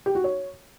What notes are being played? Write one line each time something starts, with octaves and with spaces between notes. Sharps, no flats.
G4
F#4
C#5